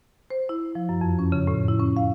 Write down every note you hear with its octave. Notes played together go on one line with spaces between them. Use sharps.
C5
E4
F3
F#2
F2
C#4
C#3
A2
E4
C#4
F5